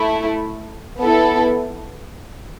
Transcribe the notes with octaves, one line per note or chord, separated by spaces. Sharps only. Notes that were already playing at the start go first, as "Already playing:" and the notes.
Already playing: A3 E4
B3 E4 A4